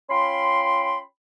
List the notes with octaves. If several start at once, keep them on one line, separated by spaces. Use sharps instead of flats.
C#4 F4 G5 B5 C6